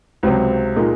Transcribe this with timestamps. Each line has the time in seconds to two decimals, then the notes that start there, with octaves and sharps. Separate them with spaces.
0.23 C#2 C3 F#3 C4
0.76 A#2 G#3 D#4 A#4